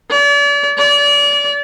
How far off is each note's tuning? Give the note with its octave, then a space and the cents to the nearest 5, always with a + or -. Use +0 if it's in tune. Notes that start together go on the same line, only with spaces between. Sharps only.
D5 -40
D5 -30